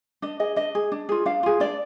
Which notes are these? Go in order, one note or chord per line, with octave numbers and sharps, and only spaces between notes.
D4 D#5
G#4 D#5
D4 D#5
G#4
D4
F4 G#4
D4 F5
F4 G#4
D4 D5